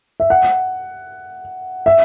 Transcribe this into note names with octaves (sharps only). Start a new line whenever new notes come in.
E5
F#5
E5